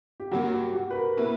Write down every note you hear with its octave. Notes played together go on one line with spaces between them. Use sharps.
G4
G2 F#3 A#3 F#4
G4
F#4
B4
A#4
B2 A#3 E4 B4